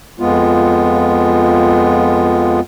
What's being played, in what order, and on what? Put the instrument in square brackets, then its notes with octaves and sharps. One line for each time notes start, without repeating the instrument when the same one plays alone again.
[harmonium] F2 G#3 B3 F4